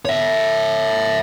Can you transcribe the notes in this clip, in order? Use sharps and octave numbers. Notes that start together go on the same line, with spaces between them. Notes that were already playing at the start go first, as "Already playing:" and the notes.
C#5 E5